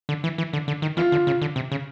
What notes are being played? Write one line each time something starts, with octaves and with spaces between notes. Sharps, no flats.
D3
E3
E3
D3
D3
D#3
E3 F4
D3
C#3
D3
C3
C#3